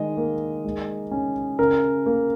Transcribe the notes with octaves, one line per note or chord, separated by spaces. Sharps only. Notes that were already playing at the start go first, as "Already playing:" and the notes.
Already playing: D#3 G#3 D#5
A#3
G#3
C#4
C#3 A#4
A#3